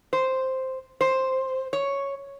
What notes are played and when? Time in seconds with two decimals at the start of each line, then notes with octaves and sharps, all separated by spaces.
0.13 C5
1.01 C5
1.73 C#5